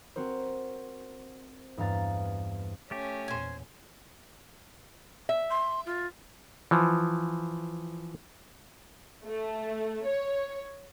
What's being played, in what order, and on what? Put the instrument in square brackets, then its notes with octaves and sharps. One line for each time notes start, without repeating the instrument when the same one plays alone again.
[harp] C4 F#4 A#4 C5
E2 G2 F5 A#5 A6
[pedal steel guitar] A3 G4 [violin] C#4
[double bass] E2 A#2 [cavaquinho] C5 G#5
[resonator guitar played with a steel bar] E5
[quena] C6
F4
[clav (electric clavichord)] E3 F3
[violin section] A3
C#5